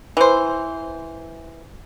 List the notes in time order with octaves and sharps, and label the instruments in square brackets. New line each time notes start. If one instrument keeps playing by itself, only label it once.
[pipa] E3 C5